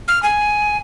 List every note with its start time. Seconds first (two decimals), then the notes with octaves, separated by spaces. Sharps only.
0.08 F6
0.23 G#5